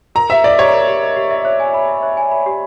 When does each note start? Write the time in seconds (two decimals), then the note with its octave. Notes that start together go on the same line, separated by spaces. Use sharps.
0.15 A#4 A#5
0.30 G4 E5
0.44 D5 D#5
0.59 G4 C#5
0.73 A#4
0.88 G4
1.02 D#5
1.16 G4
1.30 E5
1.45 C#5
1.60 G#5
1.74 B5
1.88 E5
2.03 C#5
2.17 G#5
2.31 B5
2.46 G4